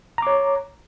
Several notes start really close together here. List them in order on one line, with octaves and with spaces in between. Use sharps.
A#5 D6 C#5